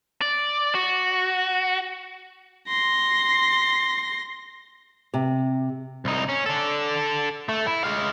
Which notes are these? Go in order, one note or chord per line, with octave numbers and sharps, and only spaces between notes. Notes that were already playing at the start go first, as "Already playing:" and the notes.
D5
F#4
C6 A#6
C3
C2 D#4
C#4
D4 A4
A3
E4
G#3 F5